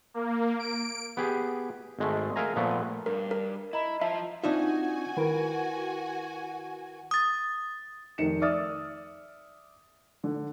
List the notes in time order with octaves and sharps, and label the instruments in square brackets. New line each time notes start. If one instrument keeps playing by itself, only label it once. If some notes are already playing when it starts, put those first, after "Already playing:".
[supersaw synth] A#3
D7
[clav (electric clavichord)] B3 G4 G#4
G#1 G#3 A3
G#4 A#4 E5 F5 G#5 A#5
A#2 F3 A3 B3
[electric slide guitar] G2 [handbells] A#4
[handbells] A#4
[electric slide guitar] E4 [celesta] D#5 A#5 B5
[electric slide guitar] F3 F4 [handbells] E5 [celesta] A5
[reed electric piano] C4 D4 F4 [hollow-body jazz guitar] D#4 E5 [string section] F#4 G#5
[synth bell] D#3 E4 G5 [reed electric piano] A#4 B4
[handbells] D#6 A6
[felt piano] F1 D#3 C#7 E7
D5 E5 D6 D#6 F6 A6
D3